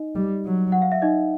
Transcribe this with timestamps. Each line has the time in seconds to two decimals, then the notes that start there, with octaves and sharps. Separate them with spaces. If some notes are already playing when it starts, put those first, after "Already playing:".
Already playing: D#4 D#5
0.15 G3
0.45 F#3
0.72 F#5
0.82 F5
0.92 E5
1.02 D#4 D#5